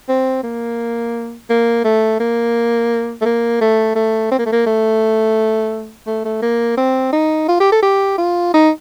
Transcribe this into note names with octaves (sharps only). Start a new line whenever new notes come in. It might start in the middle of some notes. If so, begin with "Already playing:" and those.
C4
A#3
A#3
A3
A#3
A3
A#3
A3
A3
C4
A#3
A3
A#3
A3
A3
A3
A#3
C4
D#4
F4
G4
A4
G4
F4
D#4